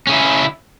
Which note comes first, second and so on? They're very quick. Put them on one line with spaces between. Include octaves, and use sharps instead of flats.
C#4 C#3 E4